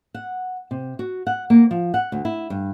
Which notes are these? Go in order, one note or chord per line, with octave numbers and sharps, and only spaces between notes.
F#5
C3
F#4
F#5
A#3
F3
F#5
D2
E4
G2